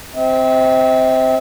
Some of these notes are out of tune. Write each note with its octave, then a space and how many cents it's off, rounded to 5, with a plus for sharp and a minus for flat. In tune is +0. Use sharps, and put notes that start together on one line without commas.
C4 +0 E5 -40